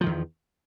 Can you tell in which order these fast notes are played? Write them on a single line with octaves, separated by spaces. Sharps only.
F3 D#3 E2